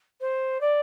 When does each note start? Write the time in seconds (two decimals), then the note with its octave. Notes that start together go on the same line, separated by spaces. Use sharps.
0.21 C5
0.61 D5